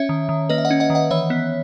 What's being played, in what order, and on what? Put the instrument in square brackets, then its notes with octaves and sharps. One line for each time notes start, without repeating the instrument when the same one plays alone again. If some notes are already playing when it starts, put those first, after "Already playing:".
Already playing: [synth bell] C#4 C#5 E5
D#3
D#3
A#3 B4 D#5
E5
D#5 F#5
C#4
D#5 F#5
D#3
D#5 F#5
E3 C#5 E5
B3